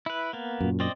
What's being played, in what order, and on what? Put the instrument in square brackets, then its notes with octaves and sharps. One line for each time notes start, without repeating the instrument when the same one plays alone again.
[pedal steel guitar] E4 B4
A#3 B3
[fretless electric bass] F#2 A#2
[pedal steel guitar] C4 D5 D#5